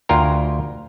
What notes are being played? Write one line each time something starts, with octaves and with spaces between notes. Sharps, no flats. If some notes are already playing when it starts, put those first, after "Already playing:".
D2 F4 A#4 G5 G#5 A#5